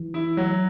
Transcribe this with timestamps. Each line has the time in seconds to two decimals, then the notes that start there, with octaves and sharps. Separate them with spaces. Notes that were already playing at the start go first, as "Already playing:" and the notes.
Already playing: E3
0.14 E4
0.37 F#3